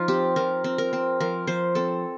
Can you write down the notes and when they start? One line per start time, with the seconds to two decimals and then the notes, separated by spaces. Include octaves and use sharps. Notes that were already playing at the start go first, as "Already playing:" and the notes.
Already playing: F3 D#4 F4
0.08 C4 G4
0.36 F3 A#4
0.64 C4
0.78 A#4
0.93 C4
1.20 F3 A#4
1.47 F3 C5
1.75 C4 A4